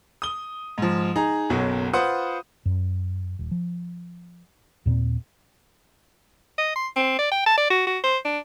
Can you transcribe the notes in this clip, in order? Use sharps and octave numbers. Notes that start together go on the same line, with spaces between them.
D#6 G7
G#2 F3
D#4 G#4 A#5
F#1 B1 B2 F#3
F4 B4 C5 F#5 D#6
F#2
D#1
F3
D#2 A#2 A#3 C4
D#5
C6
C4
D5
G5
A5
D5
F#4
F#4
C5
D4